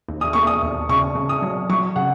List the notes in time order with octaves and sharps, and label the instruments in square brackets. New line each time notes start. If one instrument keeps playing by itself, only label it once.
[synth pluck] D#2
[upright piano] D#6
[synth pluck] A#3 [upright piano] C#6
[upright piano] D#6
[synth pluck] D#2
[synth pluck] C#3 [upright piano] C#6
[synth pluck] C#3
[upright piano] D#6
[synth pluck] F#3
[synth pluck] F#3 [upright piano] C#6
[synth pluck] C#3 [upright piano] F#5